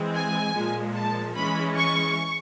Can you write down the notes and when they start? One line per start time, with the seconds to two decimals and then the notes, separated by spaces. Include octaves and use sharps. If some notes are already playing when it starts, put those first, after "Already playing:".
Already playing: E3 G#3 C4
0.14 G#5
0.54 A#2 F3 G#3
0.95 A5
1.35 E3 G#3 C#4 B5
1.75 C#6